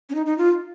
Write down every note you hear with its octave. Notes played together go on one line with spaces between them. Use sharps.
C#4
D#4
D#4
F4